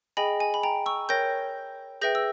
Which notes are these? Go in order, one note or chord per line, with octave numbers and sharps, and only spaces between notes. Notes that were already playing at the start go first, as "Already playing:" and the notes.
G#4 D#5 G5 G#5 B5
G#5
B5
G5 A#5
C#6 E6
A#4 C#5 G5 G6 A#6
G#4 B4 E5 G5 G6 A#6
E6